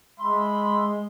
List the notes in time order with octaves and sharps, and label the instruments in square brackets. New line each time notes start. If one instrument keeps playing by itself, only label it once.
[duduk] G#3 [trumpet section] E5 B5 [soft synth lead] C6